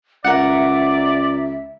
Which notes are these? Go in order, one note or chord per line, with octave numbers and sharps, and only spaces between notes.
C#2 A#4 D5 E5 F#5